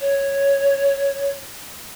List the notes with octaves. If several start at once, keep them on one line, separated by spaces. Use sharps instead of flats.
C#5